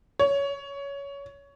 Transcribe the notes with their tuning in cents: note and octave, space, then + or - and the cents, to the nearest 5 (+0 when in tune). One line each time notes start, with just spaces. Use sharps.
C#5 +15